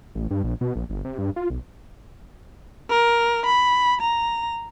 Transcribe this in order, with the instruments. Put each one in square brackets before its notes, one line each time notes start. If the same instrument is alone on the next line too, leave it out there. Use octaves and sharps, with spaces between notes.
[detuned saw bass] A1
G2
A#1
B2
A#1
G1
C3
G2
F4
B1
[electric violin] A#4
B5
A#5